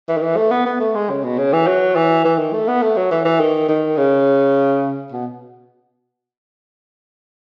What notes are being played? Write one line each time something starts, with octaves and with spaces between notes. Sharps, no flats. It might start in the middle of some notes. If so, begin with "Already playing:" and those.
E3
D#3
E3
A3
B3
B3
A3
G#3
C#3
B2
C#3
E3
F#3
E3
E3
D#3
A3
B3
A3
F#3
E3
E3
D#3
D#3
C#3
B2